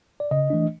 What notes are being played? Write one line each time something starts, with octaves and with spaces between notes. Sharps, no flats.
D5
C#3 D#5
E3 A3 D4